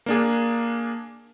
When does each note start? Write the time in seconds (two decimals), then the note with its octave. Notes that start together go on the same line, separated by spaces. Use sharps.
0.06 A#3 D4 G#4